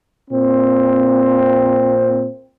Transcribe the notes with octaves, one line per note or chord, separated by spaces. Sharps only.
A#2 C4